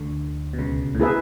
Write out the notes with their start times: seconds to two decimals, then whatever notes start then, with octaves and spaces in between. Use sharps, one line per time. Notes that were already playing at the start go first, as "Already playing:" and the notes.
Already playing: D2 D3
0.53 B2
0.58 C#2 C#3
0.95 A2
1.00 B2 E4 G#4 B4 E5